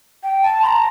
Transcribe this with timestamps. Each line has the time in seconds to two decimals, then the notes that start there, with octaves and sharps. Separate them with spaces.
0.23 G5
0.43 A5
0.62 C6
0.67 A#5